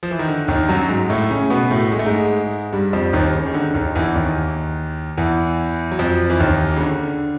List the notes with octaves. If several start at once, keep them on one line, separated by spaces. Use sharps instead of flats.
F3
E3
D#3
D3
D#2 D#3
F#2 F#3
G#2 G#3
A2 A3
C#3 C#4
B2 B3
A2 A3
G#3
A3
G#2 G#3
G2 G3
F2 F3
D#2 D#3
C#3
D#3
D3
D3
D#2 D#3
E2 E3
D#2 D#3
E2 E3
F#3
F2 F3
E3
D#2 D#3
C#3
D3